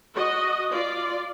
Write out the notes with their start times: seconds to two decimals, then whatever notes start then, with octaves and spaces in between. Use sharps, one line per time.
0.15 F#4 D#5
0.71 F4 D5